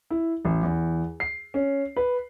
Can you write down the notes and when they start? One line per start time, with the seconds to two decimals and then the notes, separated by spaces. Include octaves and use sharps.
0.10 E4
0.45 A1
0.63 E2
1.20 C7
1.54 C#4
1.96 B4